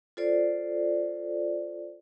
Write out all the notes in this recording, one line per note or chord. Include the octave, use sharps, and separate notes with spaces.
F4 A4 C5 D5